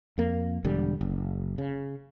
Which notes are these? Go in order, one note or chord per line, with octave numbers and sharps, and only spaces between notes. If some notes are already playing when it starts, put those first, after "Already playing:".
F2 A#3
E1 D3 G3
F#1
C#3